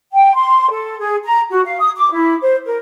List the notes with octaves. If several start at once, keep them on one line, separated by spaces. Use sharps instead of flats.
G5
C6
A4
G#4
A#5
F#4
F5
D#6
D6
E4
C5
A#4